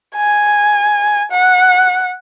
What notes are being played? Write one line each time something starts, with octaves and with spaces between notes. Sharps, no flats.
G#5
F#5